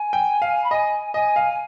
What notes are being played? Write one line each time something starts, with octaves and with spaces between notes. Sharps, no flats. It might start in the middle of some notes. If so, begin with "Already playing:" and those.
Already playing: G#5
G5
F5
B5
D#5 G#5
D#5 G#5
F5